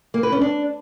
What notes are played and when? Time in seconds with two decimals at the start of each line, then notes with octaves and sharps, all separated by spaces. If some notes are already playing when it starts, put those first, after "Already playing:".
0.14 A#3
0.23 B4
0.32 C#4
0.41 D4